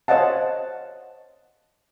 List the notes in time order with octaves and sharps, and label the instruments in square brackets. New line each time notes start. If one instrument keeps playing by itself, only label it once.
[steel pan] C5 C#5 D#5 F5 F#5 A5